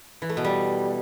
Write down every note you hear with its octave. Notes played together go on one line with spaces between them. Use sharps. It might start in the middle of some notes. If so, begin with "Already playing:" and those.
E3
A3
B2
G3